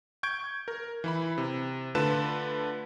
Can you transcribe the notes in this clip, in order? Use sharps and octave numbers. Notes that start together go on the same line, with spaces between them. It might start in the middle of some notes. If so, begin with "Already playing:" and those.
C#6 G6 G#6 D7
A#4
E3 E4 B5
C3
D3 A3 F4 B4 A5 E7